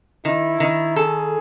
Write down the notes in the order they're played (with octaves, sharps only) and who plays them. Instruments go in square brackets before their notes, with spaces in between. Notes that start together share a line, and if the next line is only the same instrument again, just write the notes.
[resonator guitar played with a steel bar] D#3 [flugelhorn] E4
[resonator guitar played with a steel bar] D#3
[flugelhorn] G#4 [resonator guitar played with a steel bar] A4